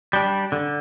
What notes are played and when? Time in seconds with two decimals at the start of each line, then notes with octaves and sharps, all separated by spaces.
0.13 G3 D4
0.52 D3